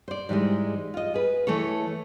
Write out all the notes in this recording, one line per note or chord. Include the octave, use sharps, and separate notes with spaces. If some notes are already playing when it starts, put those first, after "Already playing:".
C5 D5
G#2 E3 G3 G#3
F4 D#5
G#4 B4
E3 A3 A4 C#5